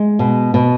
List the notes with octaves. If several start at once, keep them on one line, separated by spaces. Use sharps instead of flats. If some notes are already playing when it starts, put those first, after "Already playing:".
Already playing: G#3
B2
B2